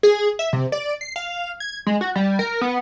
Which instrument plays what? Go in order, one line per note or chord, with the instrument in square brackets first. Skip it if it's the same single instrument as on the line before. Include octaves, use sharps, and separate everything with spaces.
[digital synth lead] G#4
E5
C3
D5
C7
F5
G#6
G#3
F#4
G3
A#4
B3